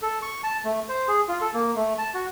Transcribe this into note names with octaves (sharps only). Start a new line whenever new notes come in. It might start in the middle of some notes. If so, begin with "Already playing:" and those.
A4
C#6
A5
A3
C5
G#4
F4
A4
A#3
A3
A5
F#4